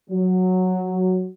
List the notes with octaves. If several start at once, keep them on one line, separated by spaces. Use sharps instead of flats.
F#3